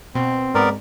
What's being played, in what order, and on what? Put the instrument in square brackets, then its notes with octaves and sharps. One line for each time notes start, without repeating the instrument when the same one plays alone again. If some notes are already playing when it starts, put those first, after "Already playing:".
[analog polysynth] B2 [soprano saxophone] C4
[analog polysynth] G#2 [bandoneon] B3 A#4 D5